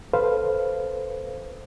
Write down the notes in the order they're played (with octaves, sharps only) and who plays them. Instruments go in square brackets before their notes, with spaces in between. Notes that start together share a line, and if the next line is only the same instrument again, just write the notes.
[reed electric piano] A4 B4 C5 F5